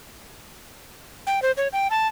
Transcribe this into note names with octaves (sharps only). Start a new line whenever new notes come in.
G5
C5
C#5
G5
A5